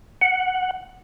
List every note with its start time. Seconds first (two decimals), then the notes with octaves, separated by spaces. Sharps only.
0.22 F#5